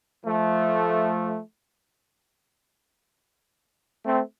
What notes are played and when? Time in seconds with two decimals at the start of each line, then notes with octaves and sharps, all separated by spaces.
0.25 F3 A3
4.05 A3 C4